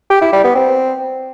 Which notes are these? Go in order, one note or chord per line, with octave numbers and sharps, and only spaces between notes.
G4
E4
G3
B3
C4